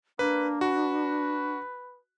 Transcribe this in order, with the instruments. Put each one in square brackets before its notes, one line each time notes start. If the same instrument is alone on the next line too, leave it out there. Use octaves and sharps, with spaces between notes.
[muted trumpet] A#3 [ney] D4 [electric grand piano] B4
[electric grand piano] F#4 [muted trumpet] B4